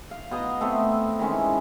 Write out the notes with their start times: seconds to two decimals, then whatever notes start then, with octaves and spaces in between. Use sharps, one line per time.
0.11 F5
0.31 B2 D#5 A#5
0.61 A3 B3 C4 A4
1.19 D#3 E3 G#3 C#4